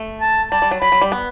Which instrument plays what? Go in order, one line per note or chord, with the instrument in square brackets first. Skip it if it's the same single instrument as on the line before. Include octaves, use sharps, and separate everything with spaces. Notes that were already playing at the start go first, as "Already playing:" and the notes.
Already playing: [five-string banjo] A3
[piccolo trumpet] A5
[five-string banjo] G3 [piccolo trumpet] A5
[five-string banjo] G3
F#3
[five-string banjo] F#3 [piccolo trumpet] B5
[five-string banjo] F#3
G3
B3